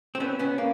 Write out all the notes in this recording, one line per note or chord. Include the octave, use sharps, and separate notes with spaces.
C4
B3 C#4
B3 C#4
A#3